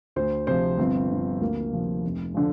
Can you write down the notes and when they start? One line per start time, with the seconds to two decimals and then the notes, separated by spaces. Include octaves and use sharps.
0.16 D2 C5
0.47 C3 F3 C5
0.78 G1 C4
1.10 G2 D3 F3
1.41 D2 A#3
1.73 C3 F3
2.04 F1
2.34 D3 F3